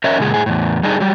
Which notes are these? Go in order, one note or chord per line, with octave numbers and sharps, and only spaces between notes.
C#4 A#4 C#5 D#5 E5
A#2 C#3 G#3 G#4
A2 G#4
E2 A2
G3 D4 D#4 G#4
F#3 G3